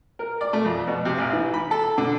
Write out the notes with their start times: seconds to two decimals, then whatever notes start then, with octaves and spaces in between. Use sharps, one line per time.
0.19 A#4
0.41 D5
0.53 A3
0.65 F2
0.87 B2
1.05 C3
1.18 A1
1.33 E3
1.54 B5
1.71 A4
1.98 D3